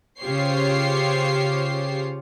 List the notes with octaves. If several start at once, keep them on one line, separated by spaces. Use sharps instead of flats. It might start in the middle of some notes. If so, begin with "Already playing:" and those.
C#3 F4 G4 C5 C#5 C7